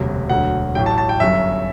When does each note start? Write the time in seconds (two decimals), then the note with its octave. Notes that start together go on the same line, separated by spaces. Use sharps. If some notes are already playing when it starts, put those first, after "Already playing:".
Already playing: E1 D2 C3 F#3
0.29 E1 D2 D3 F#3 F#5
0.75 A1 A2 F#3 G5
0.86 A5
0.98 A5
1.09 G5
1.20 G1 F#2 F#3 E5